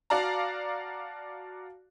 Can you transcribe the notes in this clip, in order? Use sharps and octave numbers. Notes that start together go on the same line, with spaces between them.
F#4 D5 F5 A5 A#5